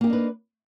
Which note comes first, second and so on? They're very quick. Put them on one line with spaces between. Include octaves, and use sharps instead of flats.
A#3 G4 D#4 D4 B4